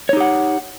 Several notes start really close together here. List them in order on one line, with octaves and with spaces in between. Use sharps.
C#5 D#4 G4 F#5